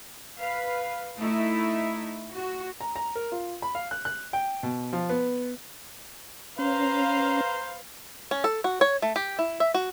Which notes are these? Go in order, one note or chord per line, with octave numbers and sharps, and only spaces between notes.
B4 F5
A3 D#4 E4
F#4
A#5
A#5
A#4
F4
B5
F5
F#6
F#6
G5
B2
F3
B3
C#4 B4 C5 F5 A#5
C#4
A4
F#4
C#5
A3
G4
E4
E5
F#4